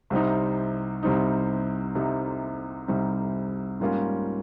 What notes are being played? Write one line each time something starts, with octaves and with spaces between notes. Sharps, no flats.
C2 C3 G3 C4 D#4
C2 C3 G3 C4 D#4
C2 C3 G3 C4 D#4
C2 C3 G3 C4 D#4
G#2 G3 A#3 C#4 F4